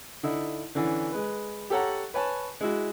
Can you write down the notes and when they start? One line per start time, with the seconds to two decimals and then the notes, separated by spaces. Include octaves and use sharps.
0.23 D3 D#4 E4
0.75 D3 E3 C#4 D4
1.12 G#3 B4
1.70 G4 A4 C#5 F#5 A#5
2.14 B4 C#5 G#5 A5
2.61 G#3 E4 F#4